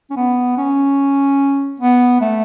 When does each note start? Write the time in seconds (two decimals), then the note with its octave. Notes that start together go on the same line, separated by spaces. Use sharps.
0.11 C#4
0.16 B3
0.58 C#4
1.80 B3
2.21 A3